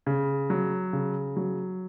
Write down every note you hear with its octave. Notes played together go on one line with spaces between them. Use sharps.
C#3
F#3
C#3
F#3